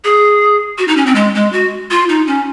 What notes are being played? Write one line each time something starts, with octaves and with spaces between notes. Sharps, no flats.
G#4
F#4
D#4
C#4
C4
G#3
G#3
F#4
F4
D#4
C#4